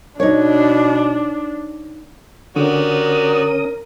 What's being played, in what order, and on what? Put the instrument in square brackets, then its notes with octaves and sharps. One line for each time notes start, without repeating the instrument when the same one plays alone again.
[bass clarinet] B2 [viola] D4 [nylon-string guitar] D#4 C#5
[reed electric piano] D3 [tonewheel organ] C#4 D#6 [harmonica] F#4 G4 D5 [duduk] A#4